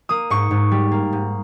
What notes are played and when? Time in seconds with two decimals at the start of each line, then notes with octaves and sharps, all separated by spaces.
0.09 A#3 D#6
0.30 G#2 C#6
0.51 G#2
0.71 G3
0.92 A#3
1.13 G#2